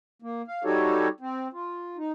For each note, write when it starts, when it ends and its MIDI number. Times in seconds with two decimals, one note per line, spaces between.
0.22 0.42 58
0.48 0.63 77
0.64 1.08 55
0.64 1.08 63
0.64 1.08 66
0.64 1.08 67
0.64 1.08 69
0.64 1.08 73
1.20 1.48 60
1.53 1.97 65
1.97 2.12 63